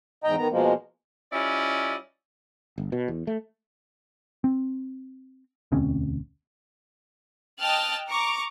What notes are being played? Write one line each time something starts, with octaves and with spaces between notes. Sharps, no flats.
E2 G#2 D#5 G5 A#5
D#3 B3 A#5
B2 F3 G#3 A#3
G3 C#4 E4 F4 D5 D#5
G1
B2
E2
A3
C4
E1 D2 C4 C#4
D#5 G5 A5 F6 F#6 A6
A#5 C#6 D6